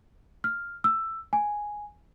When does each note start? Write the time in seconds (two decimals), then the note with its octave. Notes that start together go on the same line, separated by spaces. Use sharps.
0.44 F6
0.84 E6
1.33 G#5